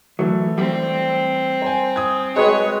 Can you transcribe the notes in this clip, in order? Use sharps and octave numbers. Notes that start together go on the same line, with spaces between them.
E3 F#3 A3
G3 C4
C5 G#5
D#6 G#6
G#3 F#4 B4 C#5 G5